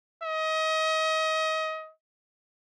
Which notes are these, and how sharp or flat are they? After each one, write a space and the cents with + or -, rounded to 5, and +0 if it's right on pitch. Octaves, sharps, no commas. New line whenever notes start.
D#5 +30